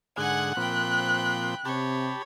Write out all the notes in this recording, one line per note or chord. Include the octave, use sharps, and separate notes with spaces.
G#2 D3 G#4 F#5 G#5 F#6
A#2 F3 C4 G5 B5
C3 G4 C#5 A5 B5